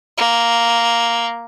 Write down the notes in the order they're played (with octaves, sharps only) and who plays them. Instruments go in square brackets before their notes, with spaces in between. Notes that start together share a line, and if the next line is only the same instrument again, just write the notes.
[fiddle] A#3